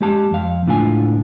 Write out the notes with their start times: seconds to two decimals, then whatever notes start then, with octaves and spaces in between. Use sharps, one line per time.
0.01 G#3 G4 A5
0.31 F2 F5
0.67 C#2 A2 D4 F4 G#5